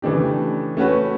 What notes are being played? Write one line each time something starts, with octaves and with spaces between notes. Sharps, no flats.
C#3 E3 A3 D4 G4
A3 C#4 F#4 B4